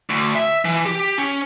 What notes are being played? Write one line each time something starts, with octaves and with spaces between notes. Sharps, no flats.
D2
E5
E3
G4
C#4